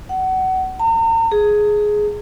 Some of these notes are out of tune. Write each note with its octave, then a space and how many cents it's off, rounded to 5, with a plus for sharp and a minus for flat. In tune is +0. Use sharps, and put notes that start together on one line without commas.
F#5 +25
A#5 -40
G#4 +10